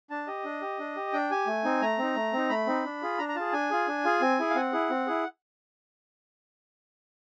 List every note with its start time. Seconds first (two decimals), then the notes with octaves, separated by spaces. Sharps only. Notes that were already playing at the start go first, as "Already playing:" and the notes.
0.10 D4 A5
0.27 G4 D#5
0.45 D4
0.62 G4
0.79 D4
0.96 G4
1.13 D4 G5
1.31 G4 G#5
1.47 A3
1.64 C4 D#4
1.82 A3 A#5
1.98 C4 D#4
2.16 A3
2.33 C4 D#4
2.50 A3 B5
2.67 C4 D#4
2.85 D4
3.02 F4 G#4
3.18 D4 A#5
3.29 A#5
3.36 F4 G#4 A5
3.53 D4 G#5
3.71 F4 G#4
3.88 D4
4.05 F4 G#4
4.22 C4
4.39 E4 G#4
4.50 F5
4.56 C4 F#5
4.73 E4 G#4
4.90 C4
5.07 E4 G#4